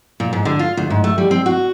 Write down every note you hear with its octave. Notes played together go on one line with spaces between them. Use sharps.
A#2
G#2
D3
F4
D2
G#2
A3
G3
C4
F#4